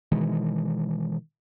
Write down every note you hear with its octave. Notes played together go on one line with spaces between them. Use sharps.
B2 D#3 E3 G#3